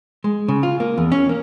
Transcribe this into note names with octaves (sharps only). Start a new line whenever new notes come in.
G#3
C#3
F4
A#3
E2
C#4
A#3